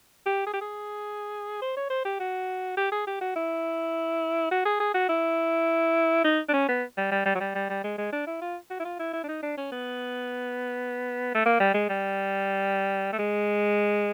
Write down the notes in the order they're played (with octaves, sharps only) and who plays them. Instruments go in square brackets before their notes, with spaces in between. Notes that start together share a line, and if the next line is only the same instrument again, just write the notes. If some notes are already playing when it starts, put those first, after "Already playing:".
[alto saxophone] G4
G#4
G4
G#4
C5
C#5
C5
G4
F#4
G4
G#4
G4
F#4
E4
F#4
G#4
G#4
F#4
E4
D#4
D4
C#4
B3
G3
G3
G3
F#3
G3
G3
G3
G#3
G#3
D4
E4
F4
F#4
E4
F4
E4
E4
D4
D#4
D4
C#4
B3
A3
A#3
G3
G#3
G3
A3
G#3